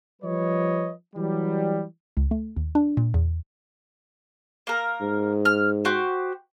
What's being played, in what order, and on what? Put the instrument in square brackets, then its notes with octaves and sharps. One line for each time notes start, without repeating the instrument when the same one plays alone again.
[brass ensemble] F3 G3 B4 C#5 D#5
E3 F#3 G3
[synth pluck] C#2
A3
D#2
D4
A#2
E2
[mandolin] A#3 A#4
[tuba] G#2
[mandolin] F6
F#4 G4 C5